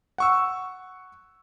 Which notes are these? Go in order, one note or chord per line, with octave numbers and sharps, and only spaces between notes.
F#5 C#6 E6